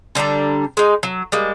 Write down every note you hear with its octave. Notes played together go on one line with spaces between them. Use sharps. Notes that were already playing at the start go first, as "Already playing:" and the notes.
D3 G3 D4 A#5
G#3 D#4
F#3
G3 G#3 A#3